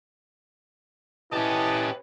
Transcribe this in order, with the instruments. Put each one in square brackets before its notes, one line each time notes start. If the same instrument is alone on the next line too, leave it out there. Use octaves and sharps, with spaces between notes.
[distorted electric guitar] C#4 G4 [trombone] E4 [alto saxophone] B4 [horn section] D#5 A5